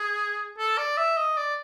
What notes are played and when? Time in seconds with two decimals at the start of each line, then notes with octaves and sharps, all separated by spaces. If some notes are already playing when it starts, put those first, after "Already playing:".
Already playing: G#4
0.58 A4
0.78 D5
0.97 E5
1.17 D#5
1.37 D5